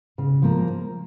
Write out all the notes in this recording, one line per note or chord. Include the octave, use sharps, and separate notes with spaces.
C#3
F3 A#3